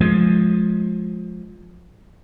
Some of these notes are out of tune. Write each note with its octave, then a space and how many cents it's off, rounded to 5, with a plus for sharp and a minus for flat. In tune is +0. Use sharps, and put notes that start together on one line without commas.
F3 +20 G#3 +20